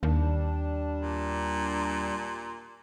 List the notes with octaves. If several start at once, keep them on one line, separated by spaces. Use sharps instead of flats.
D#2 G3 D4
A#2